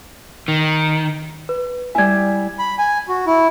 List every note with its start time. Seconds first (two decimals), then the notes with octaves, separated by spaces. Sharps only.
0.48 D#3
1.49 B4
1.95 G3 E4 G#5 G#6
2.59 B5
2.78 G#5
3.09 F#4
3.27 E4